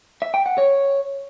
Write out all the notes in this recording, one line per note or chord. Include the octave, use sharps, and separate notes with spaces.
E5
G5
F#5
C#5